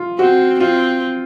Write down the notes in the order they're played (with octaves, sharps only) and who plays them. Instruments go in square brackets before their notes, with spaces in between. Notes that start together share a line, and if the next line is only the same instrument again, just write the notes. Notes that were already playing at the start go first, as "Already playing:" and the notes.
Already playing: [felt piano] F4
[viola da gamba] C4 [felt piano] F#4
[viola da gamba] C4 [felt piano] F4